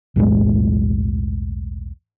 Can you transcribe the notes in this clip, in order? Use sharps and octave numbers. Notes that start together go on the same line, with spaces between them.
B1 E2 A2 G#3